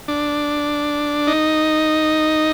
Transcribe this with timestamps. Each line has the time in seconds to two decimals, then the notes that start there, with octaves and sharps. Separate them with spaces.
0.08 D4
1.27 D#4